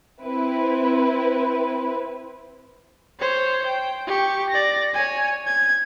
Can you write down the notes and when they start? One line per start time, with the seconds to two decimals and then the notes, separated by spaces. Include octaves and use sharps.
0.23 C4 E4 B4
3.19 C5 C#5
3.66 G5
4.07 G4 C#6
4.50 D5 A#6
4.94 C#5 G#5
5.47 G#6